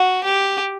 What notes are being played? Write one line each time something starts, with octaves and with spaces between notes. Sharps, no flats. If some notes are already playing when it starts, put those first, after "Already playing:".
Already playing: F#4
G4